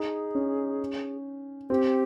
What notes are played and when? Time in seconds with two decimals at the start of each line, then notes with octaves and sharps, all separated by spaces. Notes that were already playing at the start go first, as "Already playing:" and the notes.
Already playing: D#4 G#4
0.35 C#4
1.70 C4 G4